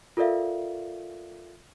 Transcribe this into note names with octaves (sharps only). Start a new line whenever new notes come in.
F4 A4 A#4 D5 E5 F5